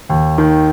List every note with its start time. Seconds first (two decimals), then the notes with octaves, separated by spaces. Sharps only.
0.09 D#2
0.38 D#3